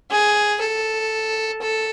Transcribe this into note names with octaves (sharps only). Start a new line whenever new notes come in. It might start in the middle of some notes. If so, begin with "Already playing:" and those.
G#4
A4
A4